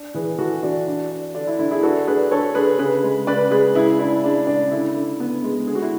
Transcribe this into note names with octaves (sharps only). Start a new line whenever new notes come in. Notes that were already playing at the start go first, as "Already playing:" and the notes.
Already playing: D4
E3 G#4 B4
E3 F#4 A4
E3 D4 F#4
D4
D4
D3 D4
E4
D3 E4
E4 G#4
D4 F#4 A4
D4 G#4 B4
D3 A4 C#5
D3 G#4 B4
C#3 G#4 B4
G#3
C#3 B4 D5
G#3 G#4 B4
C#3 E4 G#4
D4 E4
G#3 D4
C#3 D4
D3 E4
D3
B3
G#3
D3 G#4
F#4
E4